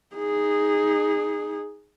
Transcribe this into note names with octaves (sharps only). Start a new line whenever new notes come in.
D#4 G#4